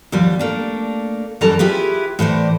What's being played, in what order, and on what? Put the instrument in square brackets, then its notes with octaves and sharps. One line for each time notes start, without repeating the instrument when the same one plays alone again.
[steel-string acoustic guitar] D#2 F3 G3 B3
A3 A#3 D4
F#2 E3 G3 A4 A5 A#5
E4 F4 G4 G#4 B4
A2 E3 C5 D5